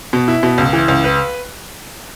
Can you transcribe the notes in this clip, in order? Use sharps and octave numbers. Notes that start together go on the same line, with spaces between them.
B2
E4
B2
C#2
E3
C#2
B4